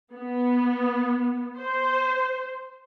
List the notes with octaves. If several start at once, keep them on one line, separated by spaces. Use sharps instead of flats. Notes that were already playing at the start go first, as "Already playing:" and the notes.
B3
C5